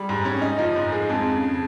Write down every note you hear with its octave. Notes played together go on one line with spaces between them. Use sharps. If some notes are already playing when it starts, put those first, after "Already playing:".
Already playing: G3 G#4
G#2
C#4
D#4
F3
G#2
G#3
F2
C#3